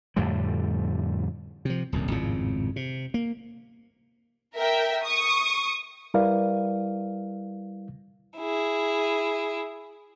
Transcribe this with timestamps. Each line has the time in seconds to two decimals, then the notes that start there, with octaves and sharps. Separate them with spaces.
0.16 F2 A2 D3 G3
1.65 C3 F3
1.92 D#1 C2 F#2
2.11 G#1 F2 A2 C#3
2.76 C3
3.14 A#3
4.55 A#4 E5 G5
5.03 C#6 D#6
6.14 G3 E4 A#4 B4 D5 F5
8.38 E4 G#4